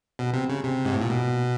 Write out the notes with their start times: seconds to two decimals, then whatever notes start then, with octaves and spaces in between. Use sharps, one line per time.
0.19 B2
0.33 C3
0.49 C#3
0.64 C3
0.85 G#2
0.93 A2
1.01 A#2
1.10 B2